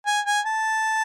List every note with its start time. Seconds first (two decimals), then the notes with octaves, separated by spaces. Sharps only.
0.06 G#5
0.26 G#5
0.46 A5